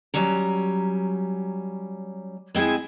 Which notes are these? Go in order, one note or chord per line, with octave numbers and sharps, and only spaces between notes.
F#3 G3 C#4 A#5
G#3 C4 E4 G#4 G#5